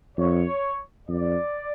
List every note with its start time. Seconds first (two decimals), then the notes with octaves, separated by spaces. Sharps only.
0.18 F2 C#5
1.09 F2 D5